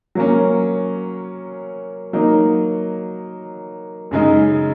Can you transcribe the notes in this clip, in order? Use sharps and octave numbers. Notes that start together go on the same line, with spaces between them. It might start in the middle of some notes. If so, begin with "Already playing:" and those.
F#3 A#3 C#4
F#3 A#3 D#4
F#2 C#3 G#3 D#4